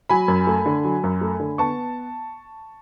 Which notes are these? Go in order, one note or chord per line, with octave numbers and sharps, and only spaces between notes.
F#3 G#5 B5
F#2
A3
D3
F#3
F#2
A3
D3
B3 A5 C#6